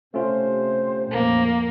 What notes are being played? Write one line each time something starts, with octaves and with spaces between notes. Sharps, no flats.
C3 A3 C#4 F4 C5
A#1 F2 A#3